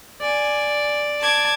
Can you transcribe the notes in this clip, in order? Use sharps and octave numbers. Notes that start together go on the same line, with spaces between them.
D5 G#5
A5 D6 G#6